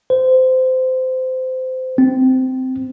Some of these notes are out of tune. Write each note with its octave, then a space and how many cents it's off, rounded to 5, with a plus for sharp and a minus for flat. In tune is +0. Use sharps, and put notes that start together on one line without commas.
C5 -20
C4 -15